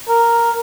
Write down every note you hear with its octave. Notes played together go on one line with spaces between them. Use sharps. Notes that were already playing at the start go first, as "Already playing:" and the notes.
A#4